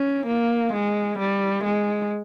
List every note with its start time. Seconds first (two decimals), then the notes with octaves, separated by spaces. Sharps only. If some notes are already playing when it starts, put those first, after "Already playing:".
Already playing: C#4
0.27 A#3
0.73 G#3
1.19 G3
1.64 G#3